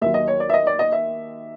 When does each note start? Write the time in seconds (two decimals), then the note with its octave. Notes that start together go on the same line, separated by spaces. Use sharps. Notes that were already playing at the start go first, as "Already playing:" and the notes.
0.01 D#2 D#3 F#3 E5
0.14 D#5
0.28 C#5
0.40 D5
0.49 E5
0.54 D#5
0.67 D5
0.79 D#5
0.92 E5